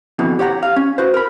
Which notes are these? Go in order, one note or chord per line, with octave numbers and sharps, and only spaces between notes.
F2 B2 D3 E3
G4 C#5 F#5 A#5
F5
C#4
F#4 B4 C5
A#4 B5